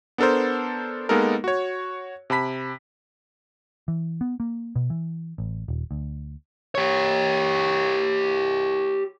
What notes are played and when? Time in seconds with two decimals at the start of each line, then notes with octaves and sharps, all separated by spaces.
0.18 B3 D4 A4 A#4 C5
1.09 G#3 A#3 B3 D#4 A4 A#4
1.44 F#4 C#5
2.30 C3 A5 B5 B6
3.88 E3
4.21 B3
4.40 A#3
4.76 B2
4.90 E3
5.38 A1
5.68 D#1
5.91 D2
6.75 G4 C#5